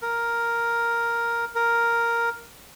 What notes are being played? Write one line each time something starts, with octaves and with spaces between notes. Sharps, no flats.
A#4
A#4